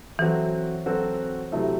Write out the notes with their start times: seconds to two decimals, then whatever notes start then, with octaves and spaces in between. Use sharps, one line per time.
0.19 E3 F#3 C4 F#4 A4
0.86 F#3 C4 F#4 A4
1.52 C3 F#3 A3 E4